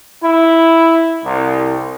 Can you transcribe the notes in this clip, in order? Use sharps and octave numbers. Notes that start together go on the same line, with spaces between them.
E4
C2